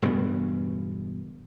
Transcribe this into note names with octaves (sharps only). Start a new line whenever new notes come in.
E1 G2 C#3 B3